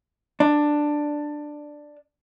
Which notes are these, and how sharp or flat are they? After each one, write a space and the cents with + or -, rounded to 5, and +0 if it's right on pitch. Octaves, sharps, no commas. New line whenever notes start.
D4 +10